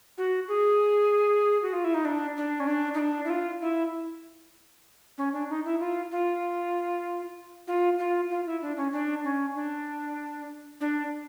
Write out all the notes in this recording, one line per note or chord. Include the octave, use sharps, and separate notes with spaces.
F#4
G#4
F#4
F4
E4
D#4
D4
D4
C#4
D4
D#4
D4
E4
F4
E4
C#4
D4
D#4
E4
F4
F4
F4
F4
F4
E4
D4
C#4
D4
C#4
D4
D4